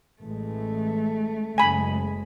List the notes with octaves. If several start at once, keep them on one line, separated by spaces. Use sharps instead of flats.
A1 E3 G#3 A3
F#1 G#3 G#5 B5